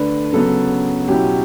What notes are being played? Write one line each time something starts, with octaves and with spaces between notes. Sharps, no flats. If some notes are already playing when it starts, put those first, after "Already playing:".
Already playing: D3 A3 D4 B4
C#3 F#3 B3 A4
B2 F#3 C#4 E4 G4